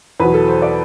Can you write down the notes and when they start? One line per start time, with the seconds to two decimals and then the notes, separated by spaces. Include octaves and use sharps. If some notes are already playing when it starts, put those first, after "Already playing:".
0.20 E2 B2 F#3 B4
0.34 A4
0.48 C5
0.62 D5